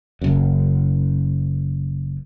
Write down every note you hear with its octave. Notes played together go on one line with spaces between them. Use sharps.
F#1 F#2